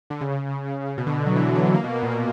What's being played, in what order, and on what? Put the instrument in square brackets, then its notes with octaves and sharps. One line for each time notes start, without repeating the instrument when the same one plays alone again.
[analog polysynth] D3
C#3
B2
D3
F#3
E3
F#3
A#3
B2
B2
A#2